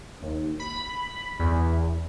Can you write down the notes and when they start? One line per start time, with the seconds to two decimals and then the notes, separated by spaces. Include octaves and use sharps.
0.22 D#2
0.60 B5
1.39 E2